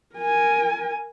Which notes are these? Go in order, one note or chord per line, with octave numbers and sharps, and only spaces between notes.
A#4 G#5